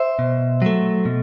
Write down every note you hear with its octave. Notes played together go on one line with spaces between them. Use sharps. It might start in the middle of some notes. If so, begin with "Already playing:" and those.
Already playing: C5 E5
B2
F#3 A3
B2